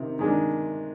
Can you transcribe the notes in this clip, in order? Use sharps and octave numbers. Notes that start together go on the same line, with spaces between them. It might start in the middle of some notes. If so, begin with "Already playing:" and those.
Already playing: C3 D#3
D#3 G#3 D4